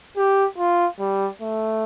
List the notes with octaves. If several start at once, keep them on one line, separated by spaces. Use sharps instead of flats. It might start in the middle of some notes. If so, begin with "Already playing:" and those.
G4
F4
G3
A3